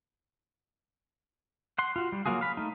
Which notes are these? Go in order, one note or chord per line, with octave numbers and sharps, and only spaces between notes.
F#5 C6
F4 F#4
G3
F#3 A#3 F4 F#4 G#4
F5 B5
A3 D#4